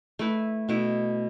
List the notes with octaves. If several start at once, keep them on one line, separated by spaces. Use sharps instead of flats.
A3 E4 B4
B2 A3 E4